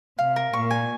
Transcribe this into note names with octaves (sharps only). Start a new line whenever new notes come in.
C3 F5
A#4
A#2 C#6
G#5